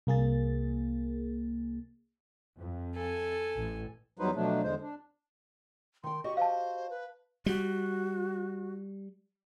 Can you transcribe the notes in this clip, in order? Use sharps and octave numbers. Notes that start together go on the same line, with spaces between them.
C2 A#3 G#4 A6
F2
A4 G#5
A1
E2 F#3 G3 D#4 B4 C5
B2 F3 F#3 A3 D4
E2 D3 G#3 C5
D4
D#3 G5 C6
F#4 G4 D#5 C#6
C5 F5 A5
B4
G3 F#4